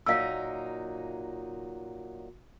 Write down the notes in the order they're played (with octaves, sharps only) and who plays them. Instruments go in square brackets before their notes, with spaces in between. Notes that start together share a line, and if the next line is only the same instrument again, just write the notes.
[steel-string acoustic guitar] A#2 F#3 D#4 [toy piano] F5 E6